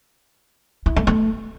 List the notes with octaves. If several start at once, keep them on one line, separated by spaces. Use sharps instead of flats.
E4
A3
A3